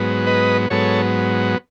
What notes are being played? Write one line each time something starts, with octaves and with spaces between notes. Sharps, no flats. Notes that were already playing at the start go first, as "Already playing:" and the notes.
Already playing: G#2 F#3 B3
B4 D#5
G#2 F#3 B3 A4 C#5